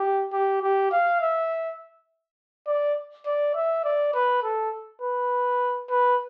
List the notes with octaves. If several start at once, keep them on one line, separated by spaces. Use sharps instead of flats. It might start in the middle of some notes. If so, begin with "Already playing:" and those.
Already playing: G4
G4
G4
F5
E5
D5
D5
E5
D5
B4
A4
B4
B4